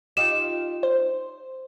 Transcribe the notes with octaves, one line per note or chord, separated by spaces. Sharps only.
D#4 F4 G4 E7
C5